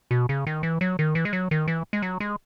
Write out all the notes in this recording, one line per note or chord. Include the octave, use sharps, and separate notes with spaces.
B2
C#3
D#3
E3
F#3
D#3
E3
G#3
F#3
D#3
E3
G#3
F#3
G#3